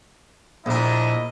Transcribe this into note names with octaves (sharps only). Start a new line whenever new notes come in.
A#1 D4 E4 A#4 D#5